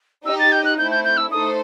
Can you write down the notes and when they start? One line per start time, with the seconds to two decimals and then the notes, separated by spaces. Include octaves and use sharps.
0.25 D#4 G4 D#5 E6
0.39 A6
0.52 G6
0.65 F#6
0.77 A3 C4 E4 G6
0.91 G6
1.04 G6
1.17 E6
1.31 A3 D#4 A4 C5 D#6